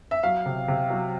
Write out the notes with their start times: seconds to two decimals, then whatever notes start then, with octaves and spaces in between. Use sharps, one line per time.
0.11 E5
0.23 F#3 F5
0.46 C3
0.68 C3
0.90 F#3